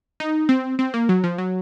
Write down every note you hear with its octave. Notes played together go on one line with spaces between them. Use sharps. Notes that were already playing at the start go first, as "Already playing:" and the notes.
D#4
C4
C4
A#3
F#3
F3
F#3